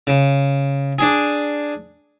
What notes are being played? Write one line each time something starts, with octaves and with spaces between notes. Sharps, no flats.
C#3
D4 G#4